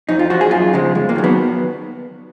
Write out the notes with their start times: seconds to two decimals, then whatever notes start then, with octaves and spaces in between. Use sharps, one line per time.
0.09 F2 D#4
0.19 F4
0.30 F3 F#4
0.41 G#4
0.51 F#2 F4
0.73 C#3 F3 G#3
0.95 F2 G#3
1.09 A#3
1.16 D#3 F#3
1.24 B3